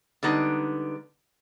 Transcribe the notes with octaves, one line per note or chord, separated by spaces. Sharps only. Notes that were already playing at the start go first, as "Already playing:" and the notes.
D3 G3 G#3 B3 D#4